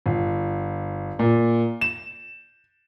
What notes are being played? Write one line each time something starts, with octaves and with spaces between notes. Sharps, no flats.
G1
A#2
E7